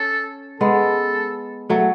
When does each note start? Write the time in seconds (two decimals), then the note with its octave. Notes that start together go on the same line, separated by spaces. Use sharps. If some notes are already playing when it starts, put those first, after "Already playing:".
Already playing: C#4 A4
0.60 G#3 B3 A4
1.70 F#3 A3